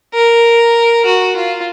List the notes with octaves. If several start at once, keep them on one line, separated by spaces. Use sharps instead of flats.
A#4
F#4
F4